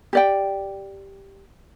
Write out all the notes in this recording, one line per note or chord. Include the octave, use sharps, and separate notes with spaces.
G4 D5 G5